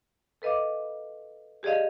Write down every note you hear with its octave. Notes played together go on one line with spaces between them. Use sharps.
A4 B4 D#5 F5 D6
G4 G#4 D5 D#5 F5